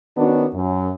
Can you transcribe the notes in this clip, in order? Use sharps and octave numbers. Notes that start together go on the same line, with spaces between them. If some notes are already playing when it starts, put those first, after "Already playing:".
D#3 B3 C#4 D4 F#4
F#2